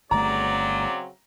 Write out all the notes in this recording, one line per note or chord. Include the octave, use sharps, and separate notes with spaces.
G1 C#3 F#3 A3 C4 D5 A#5